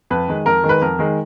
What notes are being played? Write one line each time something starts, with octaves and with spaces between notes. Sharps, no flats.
F2 B4
D#3 G#3
F2 A#4
D#3 G#3
B4
F2 A#4
D#3 G#3